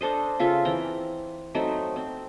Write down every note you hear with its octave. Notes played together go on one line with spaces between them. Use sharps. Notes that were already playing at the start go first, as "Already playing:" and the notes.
D4 A4 C5 D#5
C#3 F4 A4 E5
E3 C4 G5 A#5
F#3 A3 C4 D#4
C4